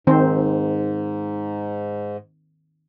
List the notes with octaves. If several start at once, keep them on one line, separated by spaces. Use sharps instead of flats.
G#2 D#3 C4 C5